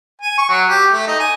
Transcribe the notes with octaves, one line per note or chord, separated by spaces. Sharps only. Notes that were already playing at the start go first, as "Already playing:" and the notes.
G#5
C#6
F#3
G4
A3
D#4
G#5